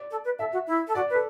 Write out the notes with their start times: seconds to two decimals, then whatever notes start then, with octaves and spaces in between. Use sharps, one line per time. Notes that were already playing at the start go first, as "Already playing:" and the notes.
Already playing: D5
0.11 A4
0.24 B4
0.39 A4 E5
0.52 F#4
0.67 E4
0.87 A4
0.95 F#4 D5
1.10 B4
1.14 A4